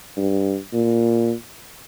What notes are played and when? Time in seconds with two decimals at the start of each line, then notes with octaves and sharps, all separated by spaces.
0.17 G2
0.73 A#2